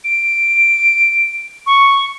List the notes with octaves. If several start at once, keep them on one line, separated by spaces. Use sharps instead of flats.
D7
C#6